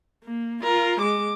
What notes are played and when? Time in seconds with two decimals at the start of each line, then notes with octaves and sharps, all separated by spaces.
0.24 A#3
0.63 F4 A#4
1.01 G#3 D6